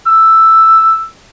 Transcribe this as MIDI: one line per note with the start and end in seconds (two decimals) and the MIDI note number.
0.06 1.03 88